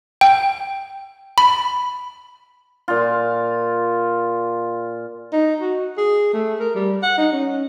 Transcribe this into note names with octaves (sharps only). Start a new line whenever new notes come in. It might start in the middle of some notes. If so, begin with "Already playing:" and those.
G5
B5
A#2 F4
D#4
F#4
G#4
A3
A#4
G3
F#5
D#4
C#4